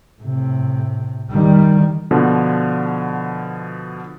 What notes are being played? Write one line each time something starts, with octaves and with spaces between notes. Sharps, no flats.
A2 C3
D#3 G3
B2 D3 F3